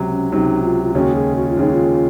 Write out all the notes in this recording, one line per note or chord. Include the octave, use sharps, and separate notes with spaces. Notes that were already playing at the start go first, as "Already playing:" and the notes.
Already playing: C#2 C3 F#3
C#4
C#2 C3 F#3 D#4
F4
F4
D#2 C#3 G#3 C#4 F#4
G#4
F#4
F4
D#2 C#3 G#3 C#4 D#4
F4